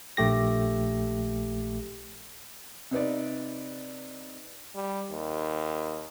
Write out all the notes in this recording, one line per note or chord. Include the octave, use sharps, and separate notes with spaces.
A#1 A3 G4 A#6
C3 D#4 B4 D5
G3
D#2